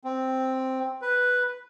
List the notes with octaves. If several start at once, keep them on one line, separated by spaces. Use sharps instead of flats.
C4
B4